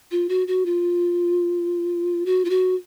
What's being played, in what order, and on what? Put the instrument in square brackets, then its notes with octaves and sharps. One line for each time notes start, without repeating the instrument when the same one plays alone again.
[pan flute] F4
F#4
F#4
F4
F#4
F4
F#4